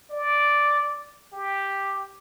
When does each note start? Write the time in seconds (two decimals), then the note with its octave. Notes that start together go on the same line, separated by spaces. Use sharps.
0.11 D5
1.33 G4